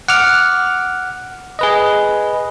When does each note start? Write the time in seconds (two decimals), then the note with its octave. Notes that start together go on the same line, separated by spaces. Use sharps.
0.08 F#5 D6 F6
1.59 G#4 B4 D#5